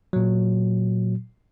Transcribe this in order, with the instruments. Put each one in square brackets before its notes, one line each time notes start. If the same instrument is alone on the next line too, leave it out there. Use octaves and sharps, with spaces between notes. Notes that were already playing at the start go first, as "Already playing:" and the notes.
[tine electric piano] A#2 F#3